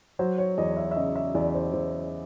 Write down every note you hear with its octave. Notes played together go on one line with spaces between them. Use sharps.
F#3 C5
C#5
E2 D#5
E5
E5
C#3 D#5
E5
E2 D5
C5
E2 C5